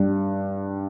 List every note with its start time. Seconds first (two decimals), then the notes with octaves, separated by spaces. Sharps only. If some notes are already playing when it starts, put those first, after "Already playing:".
Already playing: G2 G3